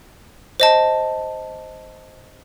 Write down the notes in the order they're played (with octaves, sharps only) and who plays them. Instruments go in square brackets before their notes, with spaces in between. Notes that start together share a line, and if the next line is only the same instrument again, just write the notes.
[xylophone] C5 D#5 A5